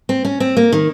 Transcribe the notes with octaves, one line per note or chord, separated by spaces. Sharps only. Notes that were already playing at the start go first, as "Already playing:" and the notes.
C4
C#4
C4
A#3
D#3